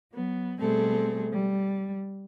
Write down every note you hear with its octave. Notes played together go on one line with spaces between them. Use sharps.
F#3 B3
B2 G3 A3 C4 G#4 A4
G3